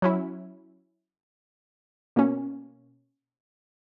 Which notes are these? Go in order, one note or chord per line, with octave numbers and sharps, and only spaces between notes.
F#3 C#4 E4
B2 A#3 C#4